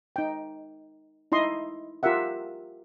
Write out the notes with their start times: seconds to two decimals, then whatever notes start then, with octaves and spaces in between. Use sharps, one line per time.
0.16 D#4 G5
1.32 D#4 E4 D#5 C6
2.03 F4 G4 A#4 E5 F#5